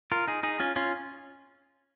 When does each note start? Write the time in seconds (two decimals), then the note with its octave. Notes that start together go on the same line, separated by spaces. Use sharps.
0.12 F4 A#4
0.28 D#4 G#4
0.43 D#4 G#4
0.60 C#4 F4
0.76 C#4 F4